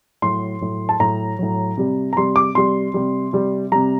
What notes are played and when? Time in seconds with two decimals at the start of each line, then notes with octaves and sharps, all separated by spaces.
0.22 A2 F#3 C6
0.61 A2 F#3
0.89 A5
1.00 A2 F#3 A#5
1.39 A2 F#3
1.77 C3 G3
2.13 A#5
2.16 C3 G3 C6
2.36 D6
2.55 C3 G3 C6
2.94 C3 G3
3.33 C3 G3
3.72 C3 G3 A#5